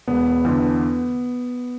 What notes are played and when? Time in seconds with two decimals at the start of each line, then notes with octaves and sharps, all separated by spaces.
0.07 E1 B3
0.45 E2 D3